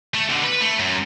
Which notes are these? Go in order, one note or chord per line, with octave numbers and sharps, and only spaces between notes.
A3
B2 D3
B4
A3
F#2